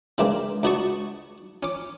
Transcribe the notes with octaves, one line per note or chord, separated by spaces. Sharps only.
C#3 E3 G#3 A#3 C4 D4
C#2 D4 F#4 D#5 A5 C#6
C#4 D6